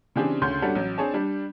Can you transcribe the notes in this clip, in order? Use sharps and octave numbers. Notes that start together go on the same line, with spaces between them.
C#3 E3 C4 D4 G4 G#4
D2 C#3 C#5 C6 G6
G3 C#4 D4 F#4 A4
A1 F#3
C4 D4 G#4 C#5 A5
G3 D4